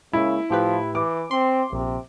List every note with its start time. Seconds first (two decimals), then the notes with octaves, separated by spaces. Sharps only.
0.13 C#3 G#3 A#3 E4
0.50 A2 F3 G4 B4
0.95 E3 D6
1.31 C4 C6
1.72 A#1 C3